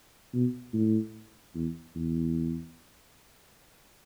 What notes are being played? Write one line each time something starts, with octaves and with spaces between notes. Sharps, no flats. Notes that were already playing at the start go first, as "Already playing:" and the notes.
B2
A2
E2
E2